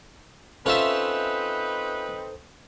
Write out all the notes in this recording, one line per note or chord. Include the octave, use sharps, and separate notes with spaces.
C4 C#4 D#4 F4 A4 B4 C5 E5